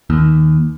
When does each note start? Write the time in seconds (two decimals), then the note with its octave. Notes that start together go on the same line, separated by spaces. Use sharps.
0.10 D#2